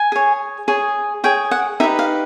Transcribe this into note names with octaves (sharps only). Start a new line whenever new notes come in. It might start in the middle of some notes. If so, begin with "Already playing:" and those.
Already playing: G#5
G#4 C#5
G#4 C#5
G#4 C#5 G5
F#5
D#4 G4 B4 E5
F5